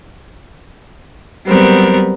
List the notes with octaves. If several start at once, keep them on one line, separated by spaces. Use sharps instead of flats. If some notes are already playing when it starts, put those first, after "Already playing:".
F#3 G3 B3 C4 A#4